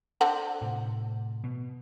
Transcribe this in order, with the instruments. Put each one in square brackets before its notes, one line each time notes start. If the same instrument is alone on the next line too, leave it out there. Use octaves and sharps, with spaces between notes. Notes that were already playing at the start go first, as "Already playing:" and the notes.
[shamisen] D3 C4 F#5
[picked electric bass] A2 C3
B2